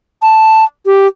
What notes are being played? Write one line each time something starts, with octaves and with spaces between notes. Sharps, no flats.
A5
G4